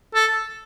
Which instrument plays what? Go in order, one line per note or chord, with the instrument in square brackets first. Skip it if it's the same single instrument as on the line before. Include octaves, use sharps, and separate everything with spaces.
[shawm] A4